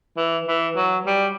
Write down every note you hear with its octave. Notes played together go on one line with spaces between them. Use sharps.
E3
E3
F#3
G3